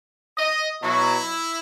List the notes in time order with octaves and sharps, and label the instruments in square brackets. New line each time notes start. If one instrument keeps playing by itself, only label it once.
[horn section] D#5
B2 F#3 E4